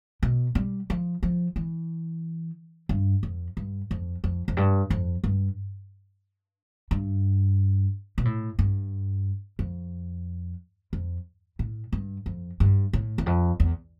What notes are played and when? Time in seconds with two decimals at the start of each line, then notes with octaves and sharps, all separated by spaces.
0.23 B2
0.55 G3
0.90 F3
1.23 F3
1.56 E3
2.89 G2
3.23 F2
3.57 G2
3.91 F2
4.24 F2
4.48 F2
4.57 G2
4.90 F2
5.24 G2
6.91 G2
8.18 B2
8.25 A2
8.59 G2
9.59 F2
10.93 F2
11.59 A2
11.93 G2
12.26 F2
12.60 G2
12.93 A2
13.18 E2
13.26 F2
13.60 E2